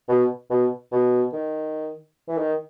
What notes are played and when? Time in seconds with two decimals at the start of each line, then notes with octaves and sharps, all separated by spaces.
0.09 B2
0.50 B2
0.92 B2
1.33 D#3
2.28 E3
2.37 D#3